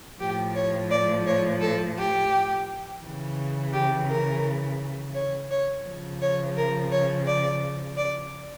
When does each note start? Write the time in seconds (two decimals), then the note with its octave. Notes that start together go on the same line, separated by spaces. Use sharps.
0.20 A2 F3 G4
0.55 C#5
0.91 D5
1.26 C#5
1.61 A4
1.97 G4
3.02 C#3 E3
3.73 G4
4.09 A#4
5.14 C#5
5.50 C#5
5.85 C#3 F3
6.21 C#5
6.57 A#4
6.91 C#5
7.26 D5
7.97 D5